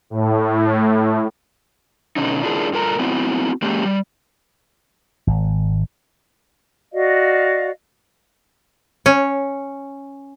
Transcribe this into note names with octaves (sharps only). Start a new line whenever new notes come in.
A2
B2 D3 C#4 D#4
D4 E4 F4 G#4 A#4
G2 F4 A4 A#4 A5 A#5
B3 C4 E4 F#4
G#3 A#3 C#4 G4
G3
G#1
F#4 D5 D#5 F5
C#4